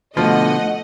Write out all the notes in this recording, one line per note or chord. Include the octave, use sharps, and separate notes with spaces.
B2 D3 F3 A3 D#5 F#5